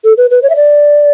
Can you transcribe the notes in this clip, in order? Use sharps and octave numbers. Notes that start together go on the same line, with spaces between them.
A4
B4
B4
C#5
E5
D5